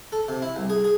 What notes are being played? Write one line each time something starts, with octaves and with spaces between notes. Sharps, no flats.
A4
C3
E4
C2
G#4
G#4